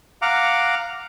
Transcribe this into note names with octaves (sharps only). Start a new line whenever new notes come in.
F5 F#5 A#5 D6